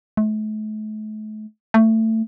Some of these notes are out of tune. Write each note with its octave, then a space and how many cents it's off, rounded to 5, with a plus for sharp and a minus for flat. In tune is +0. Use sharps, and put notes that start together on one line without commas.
A3 -40
A3 +20